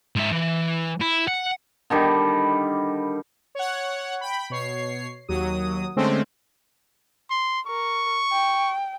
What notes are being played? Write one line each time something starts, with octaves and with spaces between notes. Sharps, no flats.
G#2 E5
E3
E4
F#5
D3 D#3 G3
C#5 F#5
G5 B5
B2 C#5 C7
D#2 F#3 D#6
D3 G#3 A3 C4 C#4
C6
A#4 C#6
G5